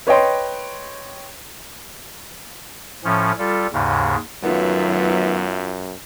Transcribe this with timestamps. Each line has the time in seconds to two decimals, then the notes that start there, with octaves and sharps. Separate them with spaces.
0.07 B4 C#5 D#5 G5 C6
3.04 A2 F3 C#4
3.39 G3 F4 A4
3.73 D#2 G#2 C#3
4.43 F#2 D#3 F#3 A3 B3 F4 E5